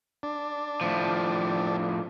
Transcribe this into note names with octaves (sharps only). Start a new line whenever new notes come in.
D4
A2 F3